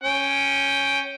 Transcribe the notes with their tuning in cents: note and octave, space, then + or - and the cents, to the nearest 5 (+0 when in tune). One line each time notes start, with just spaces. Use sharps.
C#4 +0 G5 +0